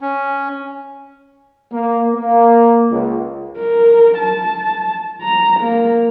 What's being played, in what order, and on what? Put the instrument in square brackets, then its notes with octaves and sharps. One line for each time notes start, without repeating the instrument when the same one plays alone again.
[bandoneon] C#4
[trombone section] A#3
A#3
C#2
[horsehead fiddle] A#4
A5
A#5
A#3